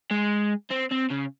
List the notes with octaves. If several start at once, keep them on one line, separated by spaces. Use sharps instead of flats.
G#3
C4
C4
C#3